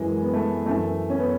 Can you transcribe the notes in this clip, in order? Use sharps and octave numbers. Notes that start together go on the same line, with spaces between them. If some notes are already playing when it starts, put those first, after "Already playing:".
Already playing: F#2 E3 G#3
B3
A3
F#2 E3 A3
C#4
B3